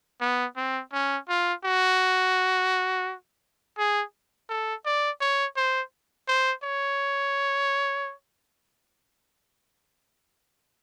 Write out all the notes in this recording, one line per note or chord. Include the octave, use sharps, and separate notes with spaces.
B3
C4
C#4
F4
F#4
G#4
A4
D5
C#5
C5
C5
C#5